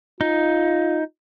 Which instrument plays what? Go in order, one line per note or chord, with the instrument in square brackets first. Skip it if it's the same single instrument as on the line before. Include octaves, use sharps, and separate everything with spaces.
[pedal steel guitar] D#4 [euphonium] F4